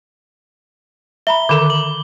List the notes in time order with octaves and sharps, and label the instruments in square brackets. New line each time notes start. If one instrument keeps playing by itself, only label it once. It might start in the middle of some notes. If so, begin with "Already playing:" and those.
[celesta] E5 A#5 B5 [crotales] G7
[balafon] D3 D#3 A4 [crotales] D6
[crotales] F#7